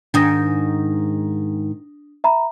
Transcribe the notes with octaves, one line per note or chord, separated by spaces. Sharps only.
G#2 D#3 D4 D#6 A#6
E5 A#5 B5